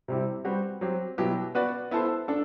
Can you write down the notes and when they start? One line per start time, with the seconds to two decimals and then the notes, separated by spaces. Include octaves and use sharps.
0.08 C3 G3 C4 E4 G4
0.45 G3 C4 F#4 B4
0.81 F#3 C4 G4
1.18 B2 F#3 B3 E4 G4
1.55 B3 F#4 B4 D5
1.91 B3 E4 A4 C5
2.28 D4 A4